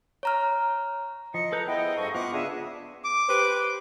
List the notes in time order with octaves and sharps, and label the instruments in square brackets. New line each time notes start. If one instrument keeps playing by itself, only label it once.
[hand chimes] C#5 A#5 F6
[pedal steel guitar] F3 [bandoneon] D#5 [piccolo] C#7
[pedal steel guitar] A4 B4 G6 [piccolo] A#5
[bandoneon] B3 E4 [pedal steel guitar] G#4 C5 [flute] D#5 [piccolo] G5
[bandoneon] G2 F3 A4 [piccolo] C#6
[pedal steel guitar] B3 F4 [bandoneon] F#5 F#6 [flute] D6
[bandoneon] C#3 D4 [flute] G#4 [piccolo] E5
[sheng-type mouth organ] D6
[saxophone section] G4 B4 C5